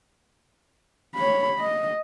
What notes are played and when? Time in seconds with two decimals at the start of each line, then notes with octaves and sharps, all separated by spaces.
1.16 C#5 B5
1.60 D#5